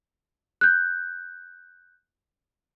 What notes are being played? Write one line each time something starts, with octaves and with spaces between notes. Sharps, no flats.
F#6 G6